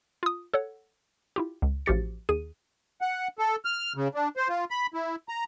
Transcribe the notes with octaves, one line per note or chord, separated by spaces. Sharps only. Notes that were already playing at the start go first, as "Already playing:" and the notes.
F4 D#6
A4 C#5 F#5
E4 F4 G4
C#2
A1 F3 F#4 G4 A6 C#7
D#2 G#4 D#7
F#5
A4
F6
C#3
D4
C5
F4
B5
E4
A#5